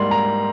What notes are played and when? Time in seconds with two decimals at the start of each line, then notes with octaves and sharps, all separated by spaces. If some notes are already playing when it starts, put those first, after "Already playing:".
Already playing: G#2 G3 A#3 C6
0.11 A#5